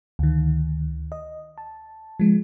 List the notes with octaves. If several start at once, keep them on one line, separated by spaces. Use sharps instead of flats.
D2 D#3
D#5
A5
F3 G#3